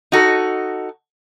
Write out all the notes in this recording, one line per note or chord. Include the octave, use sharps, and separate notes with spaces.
D#4 F#4 A4